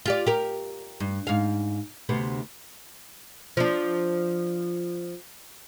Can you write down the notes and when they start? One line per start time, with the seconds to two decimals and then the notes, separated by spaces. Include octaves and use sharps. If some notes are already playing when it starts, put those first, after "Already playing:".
0.06 F4 G4 D5
0.27 G4 A#4
1.00 G2
1.27 G#2 F5
2.09 D2 C3 B3
3.57 F3 D4